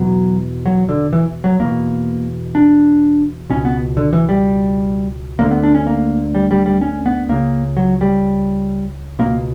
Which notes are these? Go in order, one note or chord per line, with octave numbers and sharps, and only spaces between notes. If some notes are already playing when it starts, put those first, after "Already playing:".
Already playing: E2 B2 F#3
F#3
D3
E3
F#3
E2 B2 A#3
D4
C#2 B2 C#4
B3
D3
E3
G3
D2 D3 A#3
B3
D4
C#4
A#3
G3
G3
G3
C#4
B3
C#2 C#3 A#3
F#3
G3
C#2 B2 A#3